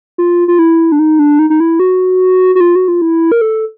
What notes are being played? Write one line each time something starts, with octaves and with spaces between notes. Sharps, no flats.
F4
F4
E4
D4
D#4
D4
D#4
D#4
E4
F#4
F#4
F4
F#4
F4
E4
A#4
A4